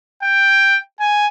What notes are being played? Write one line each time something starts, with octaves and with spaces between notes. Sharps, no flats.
G5
G#5